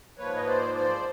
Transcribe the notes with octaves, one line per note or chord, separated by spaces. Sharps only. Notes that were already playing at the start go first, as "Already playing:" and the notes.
G#2 F3 A#3 B4 C#5
D#5
C5 D5
C5 D5